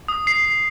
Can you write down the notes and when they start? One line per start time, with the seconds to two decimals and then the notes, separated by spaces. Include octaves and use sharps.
0.08 D#6
0.27 C7
0.45 C7